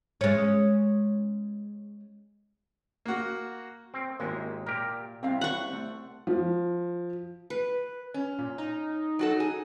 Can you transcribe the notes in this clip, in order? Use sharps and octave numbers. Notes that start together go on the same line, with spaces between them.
G#3 C#4
A#3 F#4
C4
G#1 D#2 G#3 A#3 E4 G4
A#2 G4 A#4
C2 C4 E5 F5
F#5 C#6
A3 C4
F3
B4
C#4
A#2
D#4
F#3 F#4 A4
G#4